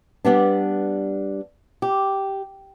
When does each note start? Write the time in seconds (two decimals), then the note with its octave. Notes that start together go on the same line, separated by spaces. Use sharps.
0.25 G3 B3 D4
1.82 G4